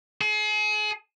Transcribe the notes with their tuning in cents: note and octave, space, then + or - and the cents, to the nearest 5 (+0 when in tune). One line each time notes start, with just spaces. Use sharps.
G#4 +35